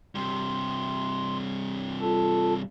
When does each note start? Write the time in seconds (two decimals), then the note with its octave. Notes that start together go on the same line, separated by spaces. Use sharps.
0.15 G2 C3 C6
2.00 F4 A4 A5